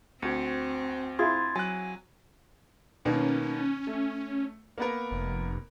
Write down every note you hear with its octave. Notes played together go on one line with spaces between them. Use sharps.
D2 C4 F#4 C#7
E4 F4 G#4 C6 G#6 A6
F#3 G#5 F#6
B2 D#3 A#3 C#4
A3
A#3 B3 A#4
F1